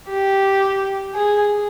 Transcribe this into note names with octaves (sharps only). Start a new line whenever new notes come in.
G4
G#4